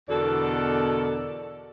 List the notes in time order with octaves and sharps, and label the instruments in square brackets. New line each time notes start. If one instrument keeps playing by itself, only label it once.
[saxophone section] E2 B2 D3 A4 A#4 D5